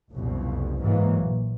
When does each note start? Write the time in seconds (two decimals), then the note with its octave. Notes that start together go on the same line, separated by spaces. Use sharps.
0.12 F#1 C2 F2 B2
0.80 G#2 E3 F#3 A#3
1.20 A#1